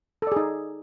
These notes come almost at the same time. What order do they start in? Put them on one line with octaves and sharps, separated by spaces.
A4 D5 G#4 D#4